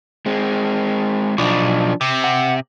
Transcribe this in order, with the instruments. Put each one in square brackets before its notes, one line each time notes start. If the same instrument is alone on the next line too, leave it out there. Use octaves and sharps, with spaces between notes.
[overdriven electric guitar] G#3 C4
[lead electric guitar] B1 [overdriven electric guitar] F3 D4
[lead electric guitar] C3
[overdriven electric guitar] F#5